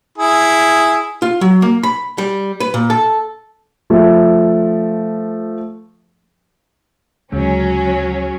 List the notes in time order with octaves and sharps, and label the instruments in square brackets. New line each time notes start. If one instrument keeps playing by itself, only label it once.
[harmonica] E4 G#4
[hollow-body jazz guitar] F4
F#3
A#3
B5
G3
B4
A#2
A4
[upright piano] F3 A3
[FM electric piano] D2 C#3 G#3 [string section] F#3 C#4